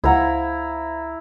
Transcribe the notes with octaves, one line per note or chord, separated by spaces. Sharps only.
C#2 E4 C5 F5 F#5 A#5